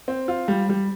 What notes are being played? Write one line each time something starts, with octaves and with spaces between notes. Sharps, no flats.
C4
F4
G3
G3